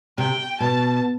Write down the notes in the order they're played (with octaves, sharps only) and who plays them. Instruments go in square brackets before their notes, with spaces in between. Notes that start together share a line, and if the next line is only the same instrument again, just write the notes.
[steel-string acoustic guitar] C3 [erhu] G5
[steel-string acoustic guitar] B2 [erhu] A5